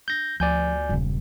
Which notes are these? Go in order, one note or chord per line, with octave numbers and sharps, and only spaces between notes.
G6 A#6
D2 F3 D5 G#5 G6
E1 G2 A#2 C#3